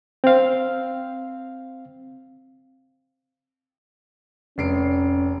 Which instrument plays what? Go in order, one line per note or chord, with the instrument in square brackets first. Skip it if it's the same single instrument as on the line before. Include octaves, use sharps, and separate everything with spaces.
[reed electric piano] C4 F5
[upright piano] F1 C7 D7 [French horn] C#4